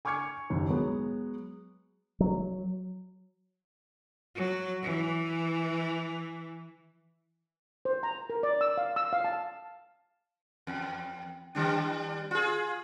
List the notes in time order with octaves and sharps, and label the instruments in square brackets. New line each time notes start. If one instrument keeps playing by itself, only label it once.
[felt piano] G#5 C#6 D6 F6 G#6 C#7
F#1 D#2
F#3 G#3 B3
[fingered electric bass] F#3
[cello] F#3
E3
[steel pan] C5
A#5
A#4
D5
E6
F5
E6
F5
A5
[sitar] E2
D#3 G3 D4
F4 G#4